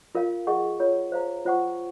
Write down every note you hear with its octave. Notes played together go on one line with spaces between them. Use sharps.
F4 A#4 F5
G#4 D#5 F#5 C#6
F4 A#4 C#5
C5 F5 A#5
F4 C5 F#5 C#6